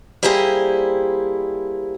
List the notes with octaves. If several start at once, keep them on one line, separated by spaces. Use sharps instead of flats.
G3 A#3 E4 G4 G#4 C5